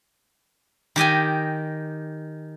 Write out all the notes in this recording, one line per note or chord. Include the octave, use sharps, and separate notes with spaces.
D#3 G4 D#5 G#5